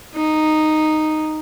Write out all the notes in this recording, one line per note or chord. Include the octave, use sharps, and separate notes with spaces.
D#4